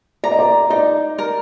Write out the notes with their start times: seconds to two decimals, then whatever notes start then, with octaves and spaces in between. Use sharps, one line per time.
0.24 D5 A#5
0.32 D#5
0.39 D5
0.70 D#4 D5
1.18 A#4